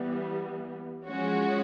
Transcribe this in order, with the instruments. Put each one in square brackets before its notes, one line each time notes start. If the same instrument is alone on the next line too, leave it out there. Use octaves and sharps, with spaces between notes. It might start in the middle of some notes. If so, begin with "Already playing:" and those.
Already playing: [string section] E3 G3 B3
F3 G#3 C#4 F#4